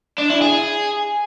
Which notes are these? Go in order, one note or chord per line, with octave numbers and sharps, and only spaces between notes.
D4
E4
G#4